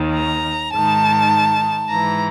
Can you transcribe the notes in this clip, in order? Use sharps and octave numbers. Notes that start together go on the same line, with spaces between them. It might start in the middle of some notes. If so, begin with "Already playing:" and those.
Already playing: D#2 D#3
A#5
G#2 D#3 A5
G#2 E3 A#5